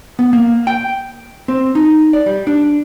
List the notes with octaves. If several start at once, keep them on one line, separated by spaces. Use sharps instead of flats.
B3
A#3
G5
C4
D#4
D5
G3
D4